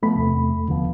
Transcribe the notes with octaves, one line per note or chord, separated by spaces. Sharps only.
F3 A3 B3 B5
E2 C3
D#1 D3 F3 B3